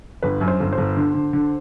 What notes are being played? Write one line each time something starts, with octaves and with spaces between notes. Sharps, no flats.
G1 B4
F#2
C5
G1
C5
G1
D3
D3
D3